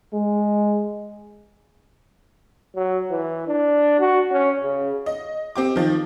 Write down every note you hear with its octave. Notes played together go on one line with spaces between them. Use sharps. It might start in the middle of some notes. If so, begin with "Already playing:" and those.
G#3
F#3
E3
D4
F#4
C#4
C#3
D#5
C4 G4 D6
D#3 F3